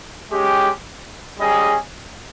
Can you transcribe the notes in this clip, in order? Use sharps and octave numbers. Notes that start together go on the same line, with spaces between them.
G#3 C#4 G4
G3 C#4 G#4 D#5